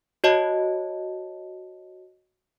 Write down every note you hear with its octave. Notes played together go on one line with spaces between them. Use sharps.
F#4 C#5 D#5 A5